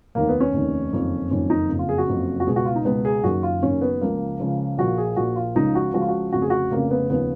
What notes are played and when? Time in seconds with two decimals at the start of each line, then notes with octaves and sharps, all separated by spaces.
0.15 F1 D#2 D#3 A#3
0.29 B3
0.40 C#4
0.54 F1 D#2 D#3
0.92 F#1 F2 D#3
1.31 F#1 F2 D#3 C#4
1.50 D#4
1.69 F#1 F2 C#3
1.79 F4
1.89 G#4
1.98 F#4
2.08 F#1 F2 C#3
2.40 F#4
2.47 C#2 B2 G#4
2.56 F#4
2.65 F4
2.76 D#4
2.85 C#2 B2 B3
3.05 G#4
3.24 F#1 F#2 D#3 F#4
3.43 F4
3.63 F#1 F#2 D#3 C#4
3.81 B3
4.01 C#2 C#3 F3 A#3
4.40 C#2 C#3 F3
4.78 A#1 A#2 F3 F#4
4.98 G#4
5.16 A#1 A#2 F3 F#4
5.36 F4
5.55 C#2 C#3 F3 D#4
5.75 F#4
5.94 C#2 C#3 F3 F#4
6.01 F4
6.08 F#4
6.33 F1 F2 C#3 F#4
6.42 G#4
6.50 F#4
6.71 F1 F2 C#3 A#3
6.91 B3
7.10 D#2 C#3 F3 B3